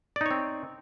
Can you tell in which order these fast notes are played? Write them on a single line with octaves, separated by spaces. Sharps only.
D5 D#4 C#5 C4